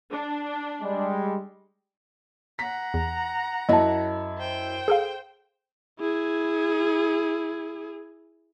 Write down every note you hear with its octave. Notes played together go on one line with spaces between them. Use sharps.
D4
G3 G#3
F#5 A#5 B6
E2
F#2 E4 D#5 A5
C5 G5
G#4 A4 F5
E4 G#4